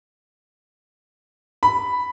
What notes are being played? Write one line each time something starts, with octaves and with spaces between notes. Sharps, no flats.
B5